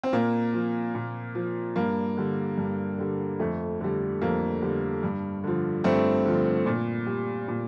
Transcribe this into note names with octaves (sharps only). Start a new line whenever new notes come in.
C4
A#2 A#3
F3
A#2
F3
G2 A#3
D3 G3
G2
D3 G3
F2 A3
D3 G3
F2 A#3
D3 G3
G2
D3 F3
G2 A3 C4
D3 F3
A#2
G3
A#2